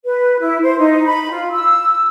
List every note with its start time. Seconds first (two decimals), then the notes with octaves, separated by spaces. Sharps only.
0.05 B4
0.40 E4
0.62 C5
0.78 D#4
1.06 B5
1.31 F4
1.52 E6